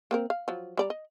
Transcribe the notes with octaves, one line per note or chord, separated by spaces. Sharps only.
A#3 C4 A#4
F5
F3 F#3
G3 D5 A#5
D#5